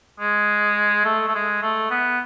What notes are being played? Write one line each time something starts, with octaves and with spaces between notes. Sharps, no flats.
G#3
A3
A3
G#3
A3
B3